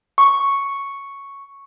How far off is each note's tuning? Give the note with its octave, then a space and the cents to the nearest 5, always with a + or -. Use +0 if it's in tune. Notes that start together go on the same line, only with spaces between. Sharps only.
C#6 +0